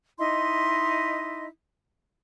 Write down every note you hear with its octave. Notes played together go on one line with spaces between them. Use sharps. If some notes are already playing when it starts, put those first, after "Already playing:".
D#4 E4 D#5 C6